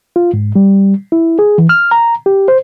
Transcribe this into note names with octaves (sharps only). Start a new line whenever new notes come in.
F4
G#2
G3
E4
G#4
E3
F6
A#5
G4
C5